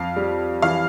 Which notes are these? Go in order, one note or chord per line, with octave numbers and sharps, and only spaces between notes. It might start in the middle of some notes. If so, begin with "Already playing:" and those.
Already playing: F2 F5
G3
E3 F5